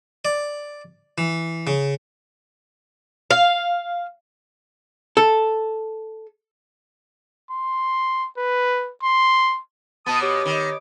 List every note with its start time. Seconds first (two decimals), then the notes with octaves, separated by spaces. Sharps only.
0.25 D5
1.18 E3
1.67 C#3
3.31 F5
5.17 A4
7.51 C6
8.38 B4
9.03 C6
10.06 B2 B3 A5 D#6
10.21 G4 C#5 D6
10.45 D#3